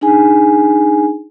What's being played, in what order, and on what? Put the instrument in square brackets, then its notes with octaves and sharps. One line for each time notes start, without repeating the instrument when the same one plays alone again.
[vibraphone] D4 D#4 G#4 G#5